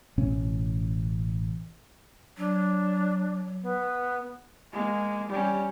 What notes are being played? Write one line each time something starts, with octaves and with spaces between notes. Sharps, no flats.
A1 B2 C#4
F#3 D4
B3
G#3 A#3
G3 C#4